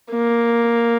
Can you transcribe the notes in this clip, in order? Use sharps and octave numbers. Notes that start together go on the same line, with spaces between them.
A#3